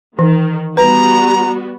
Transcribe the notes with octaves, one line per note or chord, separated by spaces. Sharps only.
D#3 E3
G3 B3 F#4 B4 A#5